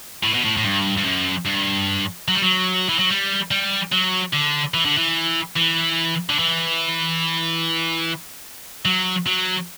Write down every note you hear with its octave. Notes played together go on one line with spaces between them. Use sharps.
A2
B2
A2
A2
G2
G2
F#2
G2
F#3
G3
F#3
E3
F#3
G3
G3
F#3
D3
E3
D3
E3
E3
D3
E3
F#3
F#3